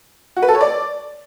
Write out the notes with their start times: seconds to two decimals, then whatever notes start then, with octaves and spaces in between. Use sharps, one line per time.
0.36 F#4
0.43 B4
0.49 A4
0.55 C#5
0.61 D5